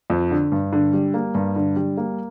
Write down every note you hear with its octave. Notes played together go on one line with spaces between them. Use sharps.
F2
D3
G2
D3
G3
A#3
G2
D3
G3
A#3